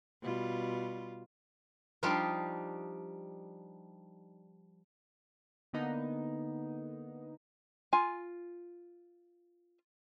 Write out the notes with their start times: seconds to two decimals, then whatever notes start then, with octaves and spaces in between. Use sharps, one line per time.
0.22 B2 G3 F4
2.03 F3 G3 D4 D#4 F4 G4
5.73 D3 A#3 B3 D#4
7.93 F4 G#5